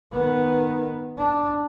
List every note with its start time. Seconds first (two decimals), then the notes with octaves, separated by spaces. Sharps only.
0.12 D#3 B3
1.17 D4